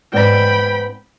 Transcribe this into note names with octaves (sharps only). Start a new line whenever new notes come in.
G#2 B3 D5 G5 B5